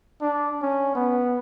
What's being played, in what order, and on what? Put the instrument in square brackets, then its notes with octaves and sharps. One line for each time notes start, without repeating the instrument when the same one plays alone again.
[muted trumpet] D4
C#4
B3